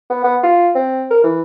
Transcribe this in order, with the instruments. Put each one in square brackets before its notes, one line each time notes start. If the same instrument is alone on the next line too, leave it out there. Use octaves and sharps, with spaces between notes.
[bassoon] B3
B3
F4
C4
A#4
E3